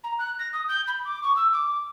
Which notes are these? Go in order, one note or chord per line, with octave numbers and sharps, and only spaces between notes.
A#5
F#6
A#6
D#6
G6
B5
D6
C#6
E6
D6